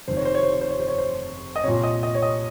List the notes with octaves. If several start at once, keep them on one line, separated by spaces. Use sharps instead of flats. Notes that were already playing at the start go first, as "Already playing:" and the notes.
F1 F2 D#3 C5
C#5
C5
C#5
C5
C#5
C5
C#5
C5
C#5
C5
D#5
C2 A#2 C#5
D#5
D#5
C#5
D#5